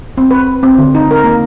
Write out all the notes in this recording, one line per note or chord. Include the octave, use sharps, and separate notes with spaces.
C4
B4
C4
D3
D#4
A#4
A#3